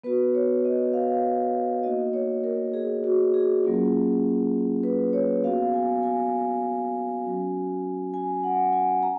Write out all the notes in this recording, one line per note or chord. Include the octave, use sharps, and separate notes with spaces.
B3 F#4 B4
C#5
D#5
F5
A#3 D#4 F#4 D#5
C#5
A#4
G#4
F#4
G#4
F#3 A#3 C#4 F4
B4
C#5
B3 F#4 F5
G#5
G#5
F#3 C#4 F#4
G#5
F#5
G#5
A#5